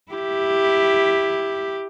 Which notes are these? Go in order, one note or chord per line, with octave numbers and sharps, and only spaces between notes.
E4 G4